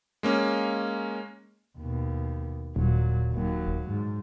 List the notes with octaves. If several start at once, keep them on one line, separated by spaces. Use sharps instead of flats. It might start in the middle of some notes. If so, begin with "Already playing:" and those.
G#3 A#3 C#4
D#2 B2
D#1 A#2 F#3
D#2 F#3
G#2